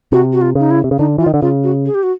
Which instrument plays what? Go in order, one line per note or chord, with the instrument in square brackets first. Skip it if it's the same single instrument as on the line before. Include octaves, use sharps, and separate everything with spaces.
[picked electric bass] C3 [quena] F#4
[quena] F#4
F4
[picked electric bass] C#3 [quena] D#4
[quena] E4
[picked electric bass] C3
C#3
[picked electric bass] D3 [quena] D#4
[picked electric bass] E3 [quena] F4
[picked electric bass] D#3
D3
[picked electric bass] C#3 [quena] F4
[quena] F#4
G#4
G4
F#4